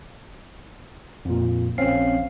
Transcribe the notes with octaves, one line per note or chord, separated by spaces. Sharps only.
F2 A#2
A#1 C4 C#4 F5 C7